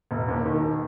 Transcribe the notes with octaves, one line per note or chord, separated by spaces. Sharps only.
E1
D#2
D#3